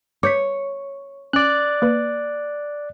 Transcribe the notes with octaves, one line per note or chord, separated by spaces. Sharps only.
C#5 D6 G6 B6
C#4 D5 F#6
A#3 B4